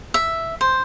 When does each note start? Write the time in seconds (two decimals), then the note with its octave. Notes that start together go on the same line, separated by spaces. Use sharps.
0.14 E5
0.61 C5